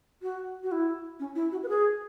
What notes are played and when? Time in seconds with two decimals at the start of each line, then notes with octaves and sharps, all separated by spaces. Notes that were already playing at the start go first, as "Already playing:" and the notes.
0.22 F#4
0.63 F#4
0.72 E4
1.20 C#4
1.35 E4
1.52 F#4
1.63 B4
1.69 G#4